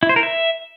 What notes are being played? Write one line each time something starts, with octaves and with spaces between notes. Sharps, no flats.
E4
C5
A#4
E5